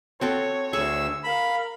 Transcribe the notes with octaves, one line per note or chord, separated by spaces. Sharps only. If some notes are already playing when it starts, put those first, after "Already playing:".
C4 F#4 A4 C#5
D2 G#4 C#6 E6
A#4 F5 B5